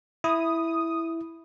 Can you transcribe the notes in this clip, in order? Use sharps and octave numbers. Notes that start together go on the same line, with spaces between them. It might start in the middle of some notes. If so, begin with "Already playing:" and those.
E4 D#6